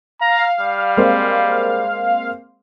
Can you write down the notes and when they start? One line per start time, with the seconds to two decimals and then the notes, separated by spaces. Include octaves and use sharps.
0.21 F5 A#5
0.60 G3
0.97 G#3 A#3 C4